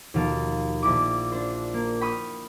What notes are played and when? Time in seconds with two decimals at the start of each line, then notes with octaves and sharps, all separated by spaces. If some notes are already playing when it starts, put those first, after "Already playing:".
0.14 D#2 B2 F3 A4 F5 D7
0.83 A#1 E4 D6
1.32 D4 C5
1.74 A#3
2.01 G5 B5 C#6 D#6 F6